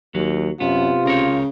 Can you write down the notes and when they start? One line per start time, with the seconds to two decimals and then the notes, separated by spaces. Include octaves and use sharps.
0.15 D#2 F#3
0.60 F#2 C3 B3 F4
1.05 C#2 C#3 A#4 C#5